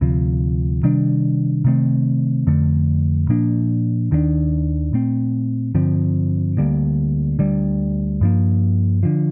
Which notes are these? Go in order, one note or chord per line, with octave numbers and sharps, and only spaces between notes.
D2 C3 F3
C3 D#3 G3 D4
C3 D#3 A3 C4
F2 D3 A3
A#2 F3 A#3 D4
D#2 D#3 A#3 D4
A#2 A3 C4
G2 D3 F3 C4
D2 D3 G3 A#3
D2 D3 G3
G2 F3 A#3
D3 F3